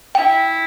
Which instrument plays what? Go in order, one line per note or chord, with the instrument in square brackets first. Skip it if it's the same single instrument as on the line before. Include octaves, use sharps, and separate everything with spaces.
[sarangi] E4 [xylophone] G5